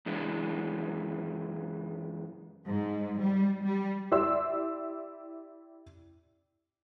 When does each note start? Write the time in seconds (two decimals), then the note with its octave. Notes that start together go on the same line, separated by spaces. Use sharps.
0.06 F#2 E3 G#3 D4
2.66 G#2
3.20 G3
3.63 G3
4.11 E4 G4 D5 E5 C6 E6